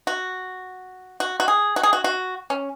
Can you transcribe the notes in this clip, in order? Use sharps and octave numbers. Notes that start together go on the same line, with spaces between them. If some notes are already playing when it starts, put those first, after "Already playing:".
F#4
F#4
F#4
G#4
F#4
G#4
F#4
F#4
C#4